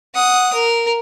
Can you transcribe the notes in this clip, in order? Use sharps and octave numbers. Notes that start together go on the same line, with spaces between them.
F#5 D#6
A#4